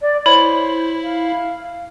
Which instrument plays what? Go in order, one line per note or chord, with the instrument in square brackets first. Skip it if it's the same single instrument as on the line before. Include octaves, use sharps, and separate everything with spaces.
[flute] D5
[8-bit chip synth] E4 [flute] C5 [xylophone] C#5 B5
[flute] F5